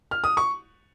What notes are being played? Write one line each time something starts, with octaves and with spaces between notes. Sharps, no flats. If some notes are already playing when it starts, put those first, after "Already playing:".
F6
D#6
C#6